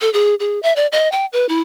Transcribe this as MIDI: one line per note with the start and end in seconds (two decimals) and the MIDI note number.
0.01 0.11 69
0.13 0.35 68
0.40 0.61 68
0.63 0.75 76
0.76 0.87 74
0.92 1.10 75
1.12 1.26 79
1.33 1.46 71
1.49 1.61 64